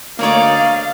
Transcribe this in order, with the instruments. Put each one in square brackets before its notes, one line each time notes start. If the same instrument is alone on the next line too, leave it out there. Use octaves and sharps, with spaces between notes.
[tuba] D2 [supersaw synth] A#3 C#5 [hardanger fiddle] D#4 D5 [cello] F5